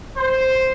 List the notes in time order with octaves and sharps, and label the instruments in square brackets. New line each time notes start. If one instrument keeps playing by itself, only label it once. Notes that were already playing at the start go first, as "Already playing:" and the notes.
[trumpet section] C5